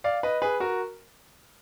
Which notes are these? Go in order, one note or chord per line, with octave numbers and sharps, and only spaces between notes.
D5 F5
B4 D#5
G#4 B4
F#4 A#4